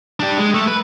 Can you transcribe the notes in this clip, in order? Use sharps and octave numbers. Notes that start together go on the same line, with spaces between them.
D4 G4
G#3
A3
B4